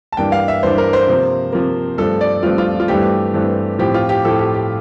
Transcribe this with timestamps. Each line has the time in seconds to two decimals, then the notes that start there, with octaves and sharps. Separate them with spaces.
0.12 A5
0.17 G2 E3 A#3 D4 G5
0.32 F5
0.48 E5
0.63 G2 E3 A#3 D4 C5
0.78 A#4
0.93 C5
1.07 C3 F3 A#3
1.52 C3 F3 A#3
1.98 G2 F3 A3 C4 A4
2.21 D5
2.43 G2 F3 A3 C4 F4
2.58 F4
2.80 F4
2.88 G2 E3 A3 C4 G4
3.34 G2 E3 A3 C4
3.79 A2 F3 C4 G4
3.94 F4
4.09 G4
4.24 A2 F3 C4 A4
4.39 G4
4.54 G4